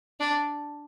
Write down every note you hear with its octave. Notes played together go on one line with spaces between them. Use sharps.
D4